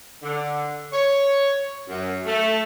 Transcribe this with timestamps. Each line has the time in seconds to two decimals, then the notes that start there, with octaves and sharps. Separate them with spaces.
0.23 D3
0.91 C#5
1.88 F#2
2.25 A3